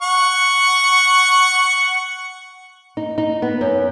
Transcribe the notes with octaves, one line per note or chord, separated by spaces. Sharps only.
F#5 C#6
D#4
D#4
B3
F#2